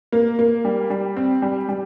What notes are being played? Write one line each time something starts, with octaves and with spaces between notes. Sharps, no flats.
A#3
A#3
G3
G3
C4
G3
G3